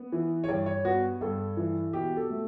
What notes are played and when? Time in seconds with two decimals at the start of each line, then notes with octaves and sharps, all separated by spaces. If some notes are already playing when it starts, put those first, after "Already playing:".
Already playing: B3
0.12 E3
0.44 C#5
0.49 G2 D5
0.66 C#5
0.85 B3 F#4
1.21 G2 A4
1.57 E3
1.93 B2 G4
2.17 A4
2.30 A3